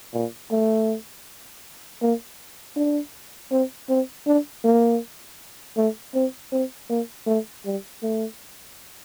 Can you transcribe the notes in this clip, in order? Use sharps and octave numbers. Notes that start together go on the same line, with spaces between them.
A#2
A3
A#3
D4
C4
C4
D4
A#3
A3
C4
C4
A#3
A3
G3
A3